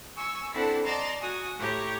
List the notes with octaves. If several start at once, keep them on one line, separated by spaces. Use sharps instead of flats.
G#5 C#6 E6
C4 D4 E4 A4 F#5 A5
D5 D#5 A5 A#5 C6
F#4 G#5 D#6
A2 G4 C#5 A#5